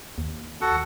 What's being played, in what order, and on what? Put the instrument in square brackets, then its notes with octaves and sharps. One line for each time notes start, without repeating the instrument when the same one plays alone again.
[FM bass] D#2
[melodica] F#4 A4 F#5